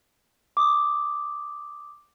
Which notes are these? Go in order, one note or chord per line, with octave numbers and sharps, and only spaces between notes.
D6 D#6